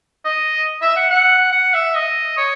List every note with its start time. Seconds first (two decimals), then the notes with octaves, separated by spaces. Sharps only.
0.25 D#5
0.82 E5
0.96 F#5
1.10 F#5
1.52 F#5
1.74 E5
1.95 D#5
2.37 C#5